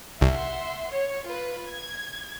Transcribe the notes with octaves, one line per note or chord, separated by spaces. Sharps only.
C2 E5 F#5 C6
C#5
F4 B4
G#6